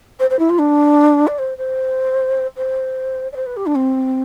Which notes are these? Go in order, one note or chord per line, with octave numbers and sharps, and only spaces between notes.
C5
C5
E4
F4
D4
D5
C5
C5
C5
D5
C5
B4
G4
D4
C4